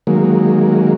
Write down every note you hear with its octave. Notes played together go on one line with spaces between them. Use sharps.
D#3 F#3 G#3 A#3